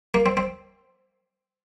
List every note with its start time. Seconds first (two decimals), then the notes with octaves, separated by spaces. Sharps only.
0.14 A#3
0.26 C4
0.37 C4